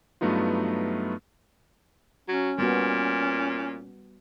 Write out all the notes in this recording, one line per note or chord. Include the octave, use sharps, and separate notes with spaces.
G2 F#3 A3 B3 D#4 F4
F#3 C#4
A#2 G3 B3 F#4